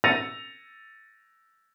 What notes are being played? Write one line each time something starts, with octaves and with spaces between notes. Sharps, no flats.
E6 A6 A#6 C#7 D#7 F7